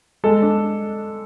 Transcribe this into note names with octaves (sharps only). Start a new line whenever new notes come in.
G#3 A4
D4